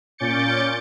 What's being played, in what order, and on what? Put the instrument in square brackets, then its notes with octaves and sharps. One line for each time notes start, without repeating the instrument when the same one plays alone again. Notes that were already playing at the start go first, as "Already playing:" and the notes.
[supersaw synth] A#2 C#4 D6 G6 A6 C#7